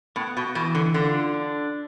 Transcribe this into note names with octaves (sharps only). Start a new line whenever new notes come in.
A2 B3
B2
B2 E3
D3
D3 F4
D4